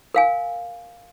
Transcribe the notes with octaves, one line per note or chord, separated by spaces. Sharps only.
A#4 F5 G#5